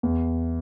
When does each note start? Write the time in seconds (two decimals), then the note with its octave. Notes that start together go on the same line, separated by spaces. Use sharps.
0.03 E2